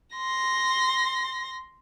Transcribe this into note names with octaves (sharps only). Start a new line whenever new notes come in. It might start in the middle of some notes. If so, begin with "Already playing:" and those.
C6 A#6